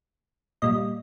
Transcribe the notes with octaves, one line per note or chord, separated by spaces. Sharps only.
A#2 G3 D#5